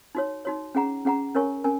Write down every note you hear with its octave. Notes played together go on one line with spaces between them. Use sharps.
D#4 F#4 C#5
D#4 F#4 C#5
C#4 G#4 F#5 A#5
C#4 G#4 F#5 A#5
C#4 A#4 C#5 G#5 C#6
C#4 A#4 G#5